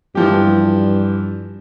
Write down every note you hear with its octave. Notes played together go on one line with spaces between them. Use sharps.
G2 E3 F3 G4